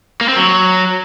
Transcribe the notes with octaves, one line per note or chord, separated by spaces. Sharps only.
A#3
C4
F#3